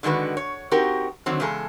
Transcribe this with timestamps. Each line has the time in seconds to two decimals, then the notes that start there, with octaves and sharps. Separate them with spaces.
0.03 D3 D#3 G#3 F#4 B4
0.37 C#5
0.71 C4 D#4 F#4 G4 A#4
1.26 D3 D#3 F#3 C4
1.40 E2 C#3 G#3 G#4 A4